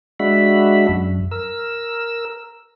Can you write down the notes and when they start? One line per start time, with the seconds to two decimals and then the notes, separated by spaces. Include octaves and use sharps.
0.20 G#3 D4 F#4 E5 B5
0.89 F#2
1.31 A#4 E6